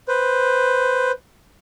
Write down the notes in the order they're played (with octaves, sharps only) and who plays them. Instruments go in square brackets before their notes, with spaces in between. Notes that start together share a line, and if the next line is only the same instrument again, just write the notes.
[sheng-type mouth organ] B4 C5